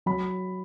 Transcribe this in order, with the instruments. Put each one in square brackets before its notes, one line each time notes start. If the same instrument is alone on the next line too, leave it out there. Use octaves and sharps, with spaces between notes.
[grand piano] F#3 B5